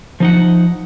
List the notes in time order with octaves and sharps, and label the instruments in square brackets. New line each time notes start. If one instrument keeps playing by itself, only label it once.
[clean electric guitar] F3 D#4 F#5